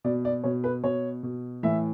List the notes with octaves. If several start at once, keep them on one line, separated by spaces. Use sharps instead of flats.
B2 D5
D5
B2 C#5
B4
B2 C#5
B2
A2 E3 E5